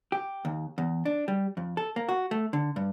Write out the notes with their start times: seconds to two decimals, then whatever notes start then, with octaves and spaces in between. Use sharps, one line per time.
0.12 G4
0.45 D#2
0.78 E2
1.05 D4
1.28 G3
1.57 F2
1.77 A4
1.96 A#3
2.09 F#4
2.31 A3
2.53 D3
2.76 G2